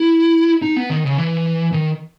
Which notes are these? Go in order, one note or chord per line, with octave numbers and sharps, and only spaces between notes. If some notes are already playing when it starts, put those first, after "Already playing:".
Already playing: E4
D#4
B3
D#3
C#3
E3
D#3